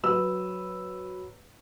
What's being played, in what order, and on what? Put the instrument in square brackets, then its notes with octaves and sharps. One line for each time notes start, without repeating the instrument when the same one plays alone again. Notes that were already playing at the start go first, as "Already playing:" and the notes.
[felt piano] F#3 B4 E6